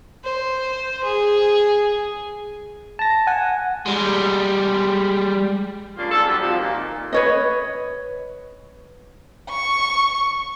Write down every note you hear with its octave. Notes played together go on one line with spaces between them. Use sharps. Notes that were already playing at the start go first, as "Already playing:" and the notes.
C5
G#4
A5 A#6
F#5 G#5
G3 G#3
C#3 A#3 D4 F4
F2 G#2 A4
F#3 G3
C3 F3
A#2 D#3
B4 C#5 D#5
C#6